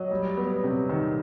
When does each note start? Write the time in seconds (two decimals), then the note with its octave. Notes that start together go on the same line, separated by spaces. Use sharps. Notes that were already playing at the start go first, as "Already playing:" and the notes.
Already playing: F#3 D#5
0.11 G3
0.37 B3
0.64 C3
0.89 D#3